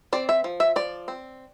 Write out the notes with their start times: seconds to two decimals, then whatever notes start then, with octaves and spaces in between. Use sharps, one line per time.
0.13 C4 D5
0.29 E5
0.44 F3
0.60 E5
0.76 F3 D5
1.08 C4